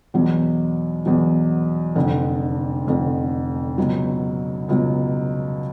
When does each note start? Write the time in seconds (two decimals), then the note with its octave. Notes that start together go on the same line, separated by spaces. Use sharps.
0.14 E2 B2 F#3
1.06 E2 B2 F#3
1.96 F1 F2 D3
2.87 F1 F2 D3
3.78 C#2 B2 F#3
4.69 C#2 B2 F#3